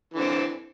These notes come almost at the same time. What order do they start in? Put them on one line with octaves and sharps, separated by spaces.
E3 D3 C4